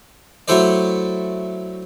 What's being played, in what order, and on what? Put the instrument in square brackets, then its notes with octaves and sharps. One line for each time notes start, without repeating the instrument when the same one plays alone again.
[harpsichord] F#3 A3 E4 A4 C5 D5